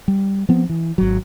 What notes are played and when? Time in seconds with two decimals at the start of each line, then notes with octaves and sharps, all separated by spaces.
0.08 G3
0.49 F3 B3 C4
0.69 E3
0.98 G#1 F#3